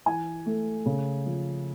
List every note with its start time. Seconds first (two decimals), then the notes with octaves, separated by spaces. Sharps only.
0.06 E3 G#5
0.46 A3
0.86 C#3
1.26 F3